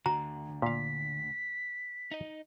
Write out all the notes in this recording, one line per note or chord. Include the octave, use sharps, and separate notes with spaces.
D2 D3 F#4 A#5
A#2 F5 B6
D#4 D#5